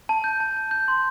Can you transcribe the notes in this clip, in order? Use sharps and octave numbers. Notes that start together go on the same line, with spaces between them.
A5
G6
A5
G6
G6
C6